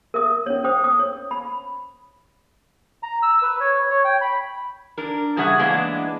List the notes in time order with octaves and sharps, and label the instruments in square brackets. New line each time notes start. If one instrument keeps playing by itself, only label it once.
[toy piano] A#4 E5 D#6
C#4 C#5
C5 G5 D#6
D#6
C#5
B5
[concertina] A#5
E6
B4
C#5
C#5
G5
B5
[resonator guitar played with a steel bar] D4 A#4
C#3 G3 G#4 E5 F#5
E3 G#3 A#3 B3 D4